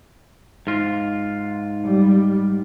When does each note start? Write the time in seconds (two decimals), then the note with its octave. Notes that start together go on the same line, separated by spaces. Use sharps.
0.67 G#2 F4
1.84 G3